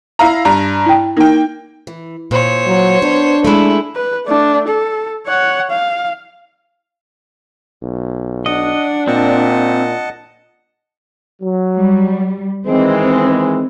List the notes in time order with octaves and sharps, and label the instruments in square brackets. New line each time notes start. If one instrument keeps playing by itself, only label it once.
[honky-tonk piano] E4 F5 A#5
G2 A#5
[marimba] E4 G5
[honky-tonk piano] A#3 G5 [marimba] D#4
[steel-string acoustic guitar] E3
[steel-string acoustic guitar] A#2 [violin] C5 C#5
[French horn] F#3
[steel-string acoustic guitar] B3 [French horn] D4
[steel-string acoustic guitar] G#3 A3 [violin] E4
[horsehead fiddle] B4
A3 D4
A4
C#5 F#5
F5
[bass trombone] B1
[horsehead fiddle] D4 [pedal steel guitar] D#5 [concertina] F#5
[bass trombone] A#2 [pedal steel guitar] C4 [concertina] D#5 F#5 A5
[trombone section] F#3
[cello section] G3
[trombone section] D#3 E3 G#3 [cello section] C4